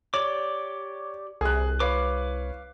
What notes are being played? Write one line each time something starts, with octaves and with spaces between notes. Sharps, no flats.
G4 C#5 D5 D6
C2 G#4 F#6
B4 C#5 F5 D6